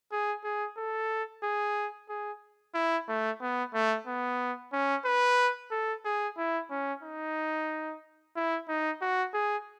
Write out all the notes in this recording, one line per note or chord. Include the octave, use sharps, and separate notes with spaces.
G#4
G#4
A4
G#4
G#4
E4
A3
B3
A3
B3
C#4
B4
A4
G#4
E4
C#4
D#4
E4
D#4
F#4
G#4